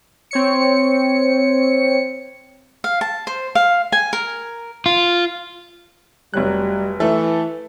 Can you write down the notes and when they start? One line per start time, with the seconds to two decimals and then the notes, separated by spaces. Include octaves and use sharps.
0.31 C4 C#5 C#7
2.84 F5
3.01 A5
3.27 C5
3.55 F5
3.92 G#5
4.13 A#4
4.86 F4
6.34 F1 F#3 G3 F#6
7.00 E3 A3 A4